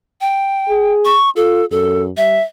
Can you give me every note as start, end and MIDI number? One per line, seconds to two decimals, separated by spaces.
0.21 0.93 79
0.70 1.15 68
1.05 1.30 85
1.36 1.62 65
1.36 1.65 69
1.71 2.11 42
1.71 2.04 69
2.17 2.38 55
2.17 2.42 76